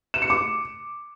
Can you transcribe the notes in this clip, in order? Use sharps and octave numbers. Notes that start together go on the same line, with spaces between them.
E7
C#7
D6